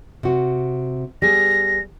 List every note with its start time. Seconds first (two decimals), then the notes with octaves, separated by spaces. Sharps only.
0.23 C3 F#4
1.22 G3 B3 G#4 A#6